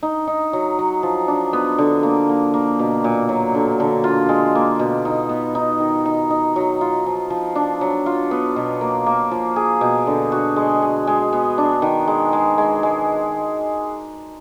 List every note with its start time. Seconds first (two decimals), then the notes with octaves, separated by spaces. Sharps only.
0.03 D#4
0.27 D#4
0.53 F#3
0.79 F#3
1.03 F3
1.28 D4
1.53 B3
1.78 D3
2.03 A#3
2.29 A#3
2.54 A#3
2.79 B2
3.04 A#2
3.29 F#3
3.55 D3
3.80 D3
4.04 F4
4.29 G#3
4.55 A#3
4.79 B2
5.05 D#4
5.29 B3
5.55 D#4
5.80 D#3
6.06 D#4
6.30 D#4
6.56 F#3
6.81 F4
7.06 F3
7.30 F3
7.55 D4
7.81 F#3
8.06 F4
8.31 B3
8.56 B2
8.81 A#3
9.06 A#3
9.31 F3
9.56 G#4
9.81 B2
10.07 D3
10.32 F#4
10.56 G#3
10.82 G#4
11.07 G#3
11.33 B3
11.58 D4
11.82 D#3
12.07 G#3
12.33 G#3
12.58 G#3
12.83 G#3